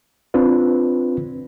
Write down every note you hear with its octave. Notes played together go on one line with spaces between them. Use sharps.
C4 D4 F4 B4